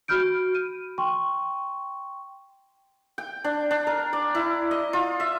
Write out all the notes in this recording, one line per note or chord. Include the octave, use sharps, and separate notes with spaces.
F#4 B5 F6 G6 D7
D#7
G5 C6 C#6
G5
D4
D4
A#4
D5
E4
D#5
F4
E5